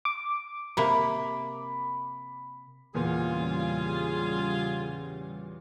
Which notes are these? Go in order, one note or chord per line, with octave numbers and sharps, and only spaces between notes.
D6
C3 A#3 B5
E2 A#2 C#3 G3 F4 G#4